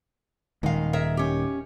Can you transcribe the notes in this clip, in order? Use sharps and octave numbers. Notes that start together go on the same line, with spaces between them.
D#1 D#3 G#3 F5
G#4 A#4 E5
C#4 G4